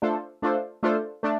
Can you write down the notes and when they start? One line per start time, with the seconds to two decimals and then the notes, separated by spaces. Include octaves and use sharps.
0.02 A3 D4 F4 A4 C5
0.42 A3 D4 F4 A4 C5
0.83 A3 D4 F4 A4 C5
1.23 A3 D4